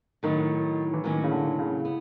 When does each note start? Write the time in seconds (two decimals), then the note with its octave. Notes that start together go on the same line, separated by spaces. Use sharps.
0.23 A2 D#3 F#3 B3 D#4
0.93 E3
1.04 A2 D#3 F#3 A#3 C#4
1.24 C#3
1.32 D3
1.59 C#3
1.85 B3